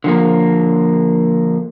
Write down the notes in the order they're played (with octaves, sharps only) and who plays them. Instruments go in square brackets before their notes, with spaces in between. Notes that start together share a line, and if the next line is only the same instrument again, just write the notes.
[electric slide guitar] D3 F3 A#3